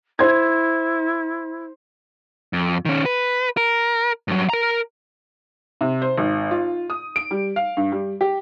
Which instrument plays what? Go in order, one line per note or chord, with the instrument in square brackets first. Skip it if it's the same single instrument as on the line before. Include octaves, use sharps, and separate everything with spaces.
[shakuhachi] E4 [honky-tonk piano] C5 G#6
[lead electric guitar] F2
D#3 C#4
B4
A#4
G2 F#3
A#4 A#5
[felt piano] C3
C5
G#1
F4
D#6
D7
G3
F5
G2
G3
G4